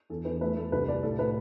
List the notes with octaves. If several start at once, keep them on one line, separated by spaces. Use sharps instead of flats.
E2 A4
E2 B4
A3 B4
A3 A4
C2 B4
C2 D5
A2 A4
A2 B4